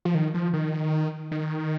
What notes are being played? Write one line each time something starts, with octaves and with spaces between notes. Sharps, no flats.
F3
D#3
F3
D#3
D#3